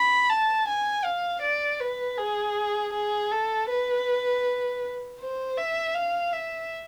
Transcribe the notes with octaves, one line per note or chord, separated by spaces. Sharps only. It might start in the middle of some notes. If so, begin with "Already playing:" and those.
Already playing: B5
A5
G#5
F5
D5
B4
G#4
G#4
A4
B4
C5
E5
F5
E5